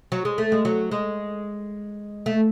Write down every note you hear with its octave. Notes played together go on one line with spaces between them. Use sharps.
F#3
G#3
A3
G#3
F#3
G#3
A3